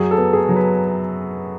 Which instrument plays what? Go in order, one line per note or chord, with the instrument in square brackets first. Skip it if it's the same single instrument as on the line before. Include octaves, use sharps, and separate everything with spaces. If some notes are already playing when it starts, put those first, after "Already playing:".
Already playing: [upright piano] F#2 F#3 [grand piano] F#4 G#4
[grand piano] A4
[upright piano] B3
[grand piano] G#4
[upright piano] F#3
[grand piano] B4